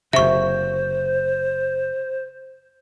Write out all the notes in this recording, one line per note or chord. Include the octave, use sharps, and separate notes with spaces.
F#1 C3 C5 E5 C#6